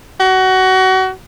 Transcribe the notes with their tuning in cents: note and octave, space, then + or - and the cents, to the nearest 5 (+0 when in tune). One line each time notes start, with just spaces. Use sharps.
F#4 +25